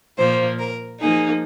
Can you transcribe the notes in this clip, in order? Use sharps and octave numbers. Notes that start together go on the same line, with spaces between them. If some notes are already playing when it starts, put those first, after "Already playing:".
A#2 F3 A#3 C5
A#4
F3 A#3 D#4 G#4